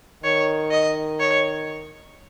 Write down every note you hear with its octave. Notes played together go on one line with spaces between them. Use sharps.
D#3 C#5
D#5
C#5